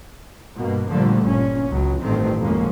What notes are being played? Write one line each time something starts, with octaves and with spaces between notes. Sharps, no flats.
G2 B2 A#3
A#2 D3 F3 G3 A3 A#3
G1 A#2 C#4
C#2 F#3
A1 G2 D#3 A3 C4
G#1 F2 B2 G#3 A#3 C#4